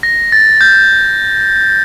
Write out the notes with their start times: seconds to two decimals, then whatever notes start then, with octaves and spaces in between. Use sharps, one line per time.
0.03 A#6
0.32 A6
0.61 G6